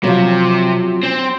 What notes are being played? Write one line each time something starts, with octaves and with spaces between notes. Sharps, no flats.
C3 F3 F#3
C4